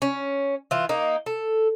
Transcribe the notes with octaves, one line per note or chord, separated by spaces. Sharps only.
C#4
E3 F4
A#3 D#4
A4